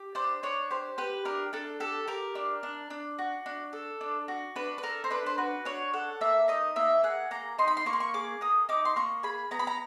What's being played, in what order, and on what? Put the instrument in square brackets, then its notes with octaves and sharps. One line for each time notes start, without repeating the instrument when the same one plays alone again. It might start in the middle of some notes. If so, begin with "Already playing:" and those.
Already playing: [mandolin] G4
D4 C5
D4 C#5
G4 C5
G4 B4
D4 A#4
D4 A4
G4 A4
G4 A#4
D4
D4
D4
F#4
D4
A4
D4
F#4
D4 B4
B4
A4 A#4
C5
D4 B4
C5
F#4 B4
D4 C#5
A4 F#5
A#3 E5
D#4 D#5
A#3 E5
G#4 F#5
A#3 A#5
D#4 C6
B5
C6
A#3 C#6
C6
C#6
G#4 D6
A#3 D#6
D#4 D6
C6
A#3 C#6
G#4 B5
B3 A#5
B5
A#5